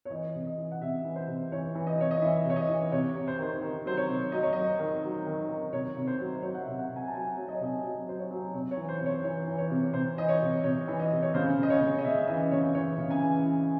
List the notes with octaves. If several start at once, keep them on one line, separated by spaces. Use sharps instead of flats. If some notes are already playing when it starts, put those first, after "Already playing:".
C#5
E3 D#5
C3
D#5
E3
F#5
C3 E5
E3
C5
C3
E3 C#5
E3
D#5
C3 C#5
D#5
E3 E5
C3 C#5
D#5
E3
C3 C#5
C3
C5
D#3 C5
D#3
F#3 C5
C#5
C3
F#3 D#5
C#5
F#3 D#5
D#3
F#3
D#3
D#3
C3 C#5
C3
C5
F#3
C5
F#3 C#5
F#5
E5
C3
F#5
C3
G#5
A5
F#3 G#5
F#3
D#5
C#5
C3 D#5
F#3 D#5
F#3 C5
C#5
F#3
C3 C#5
C#5
E3
C5
C3
C#5
E3 C#5
E3
C#5
C3
C3 C5
E3 D#5
C#5
C3
C3 C#5
E3
D#5
C3
C#5
C#3 C5
C#3 D#5
C#5
C#3
D#5
C#3 E5
E3 D#5
C#3 C#5
E3 C#5
C#3
G#5
E3
E3